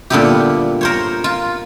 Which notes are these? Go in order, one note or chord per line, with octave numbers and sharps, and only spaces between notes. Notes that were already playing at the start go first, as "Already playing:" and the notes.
A#2 D3 G3 B3 E4 G4
A#4 C5 C#5
F4